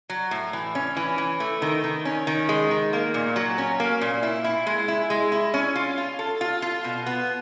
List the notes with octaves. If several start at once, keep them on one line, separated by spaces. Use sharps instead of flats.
F#3
A2
E3
C#4
E3
E3
A3
D#3
D#3
C#4
D#3
G#3
D#3
A#3
A#2
F#3
C#4
A#3
A#2
E4
E4
G#3
E4
G#3
E4
C#4
F4
F4
A4
F4
F4
B2
B3